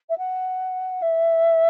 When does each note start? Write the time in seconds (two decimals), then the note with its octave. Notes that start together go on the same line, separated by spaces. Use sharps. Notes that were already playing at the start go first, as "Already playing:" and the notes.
0.09 E5
0.17 F#5
1.02 E5